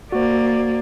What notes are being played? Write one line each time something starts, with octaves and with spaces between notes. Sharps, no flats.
A#3 F#4 C5 D5